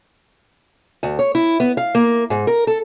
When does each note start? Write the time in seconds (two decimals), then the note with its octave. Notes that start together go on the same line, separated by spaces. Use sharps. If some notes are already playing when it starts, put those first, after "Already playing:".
1.03 D2
1.19 C#5
1.35 E4
1.60 B3
1.77 F5
1.95 A#3
2.30 G#2
2.47 A#4
2.67 A4